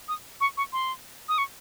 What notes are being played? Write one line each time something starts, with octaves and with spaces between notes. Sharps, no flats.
D#6
C#6
C#6
C6
D#6
C#6